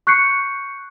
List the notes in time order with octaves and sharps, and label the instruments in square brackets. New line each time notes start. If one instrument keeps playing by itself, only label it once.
[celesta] C#6 F#6 G6 C7 C#7